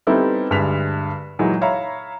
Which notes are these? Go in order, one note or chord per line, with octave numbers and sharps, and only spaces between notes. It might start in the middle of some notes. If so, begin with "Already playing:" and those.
G3 B3 C4 D#4 E4 A4
D2 G2 G#3 B6 F7
A#2 E3 F#3 G#3 D#4 E4
C#5 E5 F5 A#5 B5